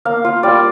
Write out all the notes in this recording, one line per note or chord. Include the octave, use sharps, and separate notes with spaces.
A#3 F5
F4 F5
G3 D5